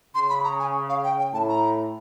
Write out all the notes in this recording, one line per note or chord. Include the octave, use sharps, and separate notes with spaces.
C#3 C6
B5
A#5
G#5
F5
G5
G5
A2 A5
A#5